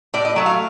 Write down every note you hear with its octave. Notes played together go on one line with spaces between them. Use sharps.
A2 D5
D#5
F#3 A3
F5